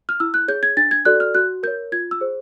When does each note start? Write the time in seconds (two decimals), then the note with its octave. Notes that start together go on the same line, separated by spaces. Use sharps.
0.09 F6
0.20 E4 E6
0.34 F#6
0.48 G#4 C#5 G6
0.63 G#6
0.77 D4 A6
0.91 G#6
1.05 F#4 A4 D5 F#6
1.20 F6
1.35 F#4 F#6
1.63 A#4 G6
1.67 C#5
1.92 F4 G#6
2.11 E6
2.21 G#4 C5